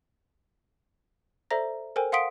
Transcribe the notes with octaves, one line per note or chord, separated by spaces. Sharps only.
A4 C5 D5 E5 A#5 A#6
A4 A#4 C5 G5 G#5
F5 F#5 C6 D#6 B6 D7